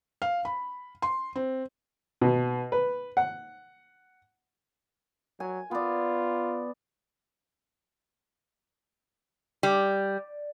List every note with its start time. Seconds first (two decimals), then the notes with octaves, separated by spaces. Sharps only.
0.22 F5
0.45 B5
1.02 C6
1.36 C4
2.22 B2
2.72 B4
3.17 F#5
5.40 F#3 G#5
5.71 B3 F4 D5
9.63 G3